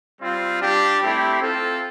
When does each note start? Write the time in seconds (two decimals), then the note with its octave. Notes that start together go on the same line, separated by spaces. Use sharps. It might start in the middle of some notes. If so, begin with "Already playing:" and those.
0.21 G3 C4 F4
0.61 G3 D4 G4
1.02 A3 C4 E4 G4
1.41 C4 F4 A4